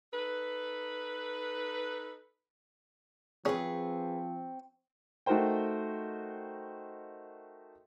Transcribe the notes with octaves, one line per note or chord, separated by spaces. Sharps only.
D#4 A4 B4
F3 C4 C#4 G#4 B4 C#6
A3 D#4 F#4 A#4 C5 G5